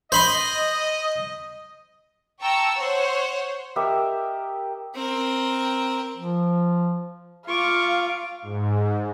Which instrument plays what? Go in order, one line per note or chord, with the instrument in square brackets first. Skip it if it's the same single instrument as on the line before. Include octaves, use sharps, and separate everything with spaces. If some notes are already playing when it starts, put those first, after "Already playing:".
[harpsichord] C5 B5 C6 [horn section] D#5
[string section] G5 A5 A#5 C#6 E6
C5 C#5 F#5
[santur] G4 A#4 D#5 E5
[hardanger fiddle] C4 A#4
[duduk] F3
[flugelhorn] F4 [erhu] F5 [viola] C#6 D6
[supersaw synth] G#2